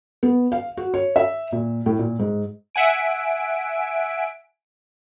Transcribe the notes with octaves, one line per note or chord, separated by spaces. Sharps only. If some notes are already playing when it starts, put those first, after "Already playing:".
B3
F5
F#4
C#5
E5
A#2
A2
A#2
G#2
E5 F#5 G#5 D7